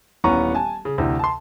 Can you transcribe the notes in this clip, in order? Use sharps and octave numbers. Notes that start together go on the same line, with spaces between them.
D#1 E3 B3 C#4 A#5 C#6
G#5 A5
C#3
D2 C3 E3
A5 C6